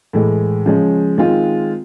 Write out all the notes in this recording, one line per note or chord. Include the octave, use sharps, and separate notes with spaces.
A2 E3 G#3
C#3 F3 G#3 C#4
D#3 G#3 C4 F4